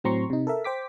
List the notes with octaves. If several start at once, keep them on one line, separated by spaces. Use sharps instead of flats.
A2 F#3 C4 A#5 C6 C#6
C3 D#4
A4 A#4 E5
C5 G5 D6 B6